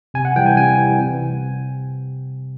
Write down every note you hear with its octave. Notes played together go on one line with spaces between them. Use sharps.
C3 G#5
F#5
E3 G3 G5
G#5
C3 G#5
E3
G3
C3